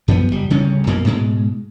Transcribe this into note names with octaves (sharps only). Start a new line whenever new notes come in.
F#2 F3 A#3 B3
F#1 G3
D1 C#3 G3 C#4
F2 B2 A#3
G#2 B2 G#3